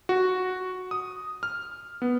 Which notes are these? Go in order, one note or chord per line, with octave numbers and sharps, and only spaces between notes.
F#4
D#6
F6
B3